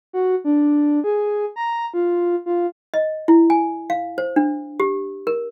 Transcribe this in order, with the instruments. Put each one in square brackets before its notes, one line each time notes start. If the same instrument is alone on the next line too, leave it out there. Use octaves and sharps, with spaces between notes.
[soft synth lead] F#4
D4
G#4
A#5
F4
F4
[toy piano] D#5
E4
G#5
F5
C5
D4
G4
A#4